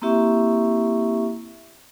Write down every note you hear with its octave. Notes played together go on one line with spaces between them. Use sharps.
A#3 C4 E4 G4 E5 C#6